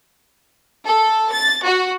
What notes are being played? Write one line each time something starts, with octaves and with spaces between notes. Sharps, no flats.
A4
A6
F#4